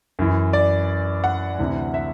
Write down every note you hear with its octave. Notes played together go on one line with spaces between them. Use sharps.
F#2 E3
D5
F#5
D2 C3 E3
E5